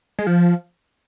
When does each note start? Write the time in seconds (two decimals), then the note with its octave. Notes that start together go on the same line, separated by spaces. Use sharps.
0.19 G#3
0.27 F3